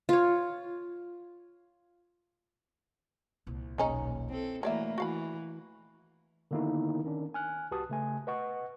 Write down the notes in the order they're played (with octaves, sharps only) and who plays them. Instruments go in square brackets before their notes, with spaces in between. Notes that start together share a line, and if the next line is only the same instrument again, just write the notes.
[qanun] F4 C#5
[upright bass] C2 A#2
[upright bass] D#1 B1 [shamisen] C#3 C#4 D#4
[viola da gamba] C4 A4 [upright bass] E4
[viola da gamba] E3 A3 A#3 [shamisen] F#3 D5 E5
[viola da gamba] E3 [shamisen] F#4 F5 B5
[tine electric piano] D3 D#3 A#3 B3 D#4 E4
D#3 C#4 D4
G#5 F6 F#6
C2 F#4 G4 B4 A5 D#6
C#3 A3 G#5
B4 D#5 F#5 C#6